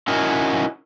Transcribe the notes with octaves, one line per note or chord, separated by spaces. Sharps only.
C#4 D#4 E4 F#4 A#4